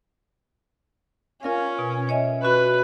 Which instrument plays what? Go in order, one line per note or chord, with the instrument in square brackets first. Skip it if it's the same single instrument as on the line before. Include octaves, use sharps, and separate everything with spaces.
[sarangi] C#4 [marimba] F4 A#4 F5
[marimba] B2
C#5 D#5 E5
[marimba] C#4 F#4 B5 [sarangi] B4